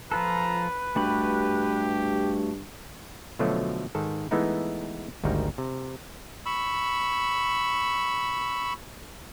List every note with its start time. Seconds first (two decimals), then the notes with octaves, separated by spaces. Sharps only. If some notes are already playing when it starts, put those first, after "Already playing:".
0.12 F3 F4 A4 B4 A#5
0.96 G2 A3 F#4 G4 B5
3.39 B2 D3 F3 F#3 A3
3.95 G#2 D#3 A4
4.31 E3 G#3 A3 B3 D#4 E4
5.24 G#1 D2 G3 D#4 A#4
5.58 C3
6.46 B5 C#6 E6